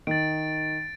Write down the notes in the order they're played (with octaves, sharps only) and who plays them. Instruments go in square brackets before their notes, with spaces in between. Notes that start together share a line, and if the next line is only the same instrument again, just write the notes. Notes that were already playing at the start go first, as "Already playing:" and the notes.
[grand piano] D#3 [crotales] A6 D7